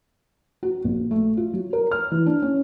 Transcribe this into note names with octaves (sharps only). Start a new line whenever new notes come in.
F#4
A#1
A3
F4
F#3
A#4
F6
E3
D4
C#4